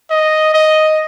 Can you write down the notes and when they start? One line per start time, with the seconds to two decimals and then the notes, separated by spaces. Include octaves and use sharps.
0.10 D#5
0.54 D#5